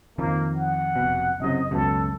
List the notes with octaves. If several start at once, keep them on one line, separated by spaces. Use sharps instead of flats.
F2 D#3 F3 A#3
F#5
F1 B2
F#1 F#2 C3 D#5
C#2 F#2 B2 A4